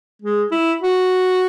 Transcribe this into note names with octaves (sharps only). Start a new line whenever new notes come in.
G#3
E4
F#4